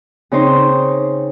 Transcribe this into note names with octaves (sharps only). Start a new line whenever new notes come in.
C#3 C4 D#4 C5